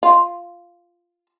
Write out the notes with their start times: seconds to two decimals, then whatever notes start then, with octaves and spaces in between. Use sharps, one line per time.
0.03 F4